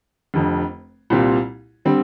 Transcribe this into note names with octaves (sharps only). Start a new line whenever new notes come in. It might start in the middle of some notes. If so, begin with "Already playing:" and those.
F1 F2 D3
C2 A#2 G3 C4 F4
D3 G3 C4